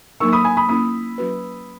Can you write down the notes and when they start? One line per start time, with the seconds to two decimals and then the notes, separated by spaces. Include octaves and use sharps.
0.20 F#3 A#3 D#4 A#4 C#6 E6
0.33 B5 D#6
0.44 G#5 B5
0.57 B5 D#6
0.69 A#3 C#4 E4 B5 D#6
1.18 F#3 C#4 F#4 B4